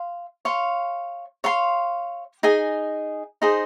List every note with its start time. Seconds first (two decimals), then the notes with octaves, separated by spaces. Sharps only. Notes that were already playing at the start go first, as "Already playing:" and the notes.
Already playing: F5 C6
0.45 C#5 F5 C6
1.44 C#5 F5 C6
2.43 D#4 G#4 D#5 G#5
3.42 D#4 G#4 C5 D#5